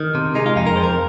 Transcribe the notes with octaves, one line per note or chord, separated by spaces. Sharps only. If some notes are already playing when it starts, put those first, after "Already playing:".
Already playing: D#3
C3
G#3 D#4
F4
F2 D#4
A#4
F2 C5
A#4